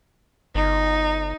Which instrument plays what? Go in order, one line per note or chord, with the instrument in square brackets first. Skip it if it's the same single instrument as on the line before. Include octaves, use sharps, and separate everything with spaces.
[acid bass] G1 [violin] D#4